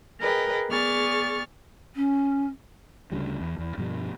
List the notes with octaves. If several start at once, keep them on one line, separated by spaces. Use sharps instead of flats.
G#4 A#4 B4 D#5 G5
B3 G#4 D5 C#6 F6 A6
C#4
D2 C#3 E3 G3
E2
E2
G2 B2 F3 G3